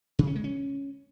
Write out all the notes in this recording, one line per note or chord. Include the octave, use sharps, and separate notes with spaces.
C3
C#4
G#3
C#4